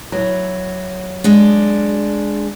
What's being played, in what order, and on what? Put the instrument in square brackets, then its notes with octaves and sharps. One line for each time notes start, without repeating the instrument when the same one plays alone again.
[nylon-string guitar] F#3 E4
[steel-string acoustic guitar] G#3 D4